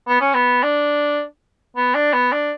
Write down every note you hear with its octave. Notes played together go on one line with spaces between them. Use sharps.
B3
C#4
B3
D4
B3
D4
B3
D4